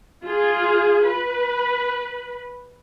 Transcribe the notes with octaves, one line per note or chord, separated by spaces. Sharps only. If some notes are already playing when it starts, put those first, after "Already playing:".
F4 G#4
B4